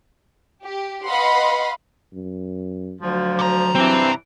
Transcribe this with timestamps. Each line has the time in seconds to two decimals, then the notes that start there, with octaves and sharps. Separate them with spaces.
0.63 G4
1.05 B4 D#5 F5 F#5 B5 C6
2.13 F#2
3.01 D2 F3 F#3
3.39 C3 A#5
3.75 G2 E3 C4